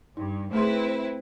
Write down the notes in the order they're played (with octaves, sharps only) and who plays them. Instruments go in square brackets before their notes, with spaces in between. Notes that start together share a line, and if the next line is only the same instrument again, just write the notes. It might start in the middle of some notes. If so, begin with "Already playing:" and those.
[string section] G2 [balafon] D#4
[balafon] A3 G#4 C6 [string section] C4 E4 B4